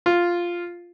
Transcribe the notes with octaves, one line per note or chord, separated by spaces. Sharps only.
F4